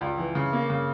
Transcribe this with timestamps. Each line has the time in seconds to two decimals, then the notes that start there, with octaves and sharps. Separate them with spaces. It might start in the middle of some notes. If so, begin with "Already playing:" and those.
0.01 C#2 D5
0.18 E3
0.35 C#3
0.53 A#3
0.70 C#3